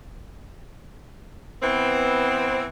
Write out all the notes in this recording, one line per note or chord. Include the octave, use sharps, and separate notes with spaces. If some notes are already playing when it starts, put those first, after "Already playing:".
E3 B3 C4